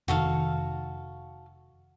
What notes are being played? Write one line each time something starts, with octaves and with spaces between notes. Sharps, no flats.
F1 D#3 F#4 A4 F5